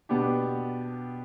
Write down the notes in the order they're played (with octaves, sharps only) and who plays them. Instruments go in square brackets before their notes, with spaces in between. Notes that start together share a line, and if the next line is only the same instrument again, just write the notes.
[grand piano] B2 B3 D4 G4